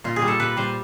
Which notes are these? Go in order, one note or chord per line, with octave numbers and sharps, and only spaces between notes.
A#2 F4
G#4
G3
A4
A#2 B4
G3 C5